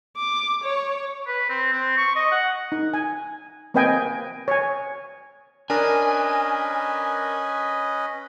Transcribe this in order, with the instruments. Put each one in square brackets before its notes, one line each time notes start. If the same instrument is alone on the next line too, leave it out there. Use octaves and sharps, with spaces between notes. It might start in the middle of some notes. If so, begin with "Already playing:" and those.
[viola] D6
C#5
[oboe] B4
C4
C4
C#6
D#5
F#5
[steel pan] D#4
G#5
A#3 C4 B4 D#5 G5 G#5
C#5 G#5
[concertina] C#4 B4 D#5 [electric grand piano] D4 A#4 [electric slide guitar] G#5